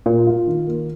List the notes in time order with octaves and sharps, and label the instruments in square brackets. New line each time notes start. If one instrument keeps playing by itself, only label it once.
[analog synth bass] A#2 [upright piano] A#3
[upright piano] F4
D#3
A#3